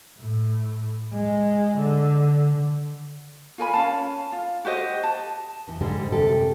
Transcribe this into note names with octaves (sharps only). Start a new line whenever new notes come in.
A2
G#3
D3
F4 A#4 G#5 B5
C#4 F5 A5
F4
F#4 G4 C5 D#5
A5
E2 E3
G#2 D3 G3 G#3 G#4
F#2 C3 G4 A4